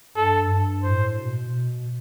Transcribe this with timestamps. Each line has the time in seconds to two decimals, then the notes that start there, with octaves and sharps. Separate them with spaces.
0.17 G2 A4
0.50 G2
0.83 A2 C5
1.17 B2
1.50 B2